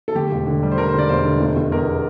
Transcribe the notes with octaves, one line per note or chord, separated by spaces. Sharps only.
A4
D2 G4
E1
D3
G3
C5
D3 A#4
C5
D3 D5
E1 C5
D3
F1
F1
E2 A#4